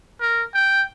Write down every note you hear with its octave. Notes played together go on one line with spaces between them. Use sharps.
A#4
G5